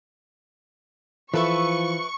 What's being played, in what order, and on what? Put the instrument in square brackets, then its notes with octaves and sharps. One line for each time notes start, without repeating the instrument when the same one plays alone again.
[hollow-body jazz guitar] E3 [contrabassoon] F3 [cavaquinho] A4 B4 E5 [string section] C#6